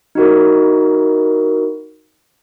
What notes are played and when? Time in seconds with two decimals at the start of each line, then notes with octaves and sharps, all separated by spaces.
0.15 D#4 E4 F#4 A#4